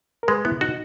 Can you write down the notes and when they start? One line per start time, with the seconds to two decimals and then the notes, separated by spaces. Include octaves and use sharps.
0.23 A#4
0.28 G#3 B4
0.45 B3 E4
0.61 D#4 F#4